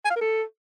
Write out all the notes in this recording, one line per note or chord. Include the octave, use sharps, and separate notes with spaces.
G#5
F5
A#4
A4